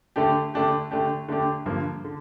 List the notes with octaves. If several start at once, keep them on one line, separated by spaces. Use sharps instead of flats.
D3 A3 D4 G4
D3 A3 D4 G4
D3 A3 D4 G4
D3 A3 D4 G4
G2 D3 F3 A#3
D3